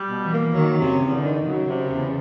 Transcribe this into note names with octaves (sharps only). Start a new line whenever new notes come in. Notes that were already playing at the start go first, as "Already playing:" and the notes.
Already playing: G3
B2
E3
A#3
D#3 F#3
C3
C#3
E2
D3
D#3
C#3 F#3
C3
E2